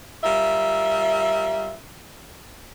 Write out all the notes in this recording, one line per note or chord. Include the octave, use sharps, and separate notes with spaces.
G3 F4 A#4 E5